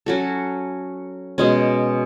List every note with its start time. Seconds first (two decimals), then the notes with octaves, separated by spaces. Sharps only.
0.06 F#3 C#4 F#4 A4
1.38 B2 G#3 C#4